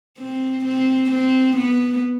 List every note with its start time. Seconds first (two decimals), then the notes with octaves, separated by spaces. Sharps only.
0.18 C4
0.65 C4
1.11 C4
1.56 B3